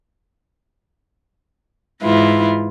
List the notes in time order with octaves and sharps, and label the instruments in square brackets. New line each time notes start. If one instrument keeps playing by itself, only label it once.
[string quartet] G#2 E3 E4 F4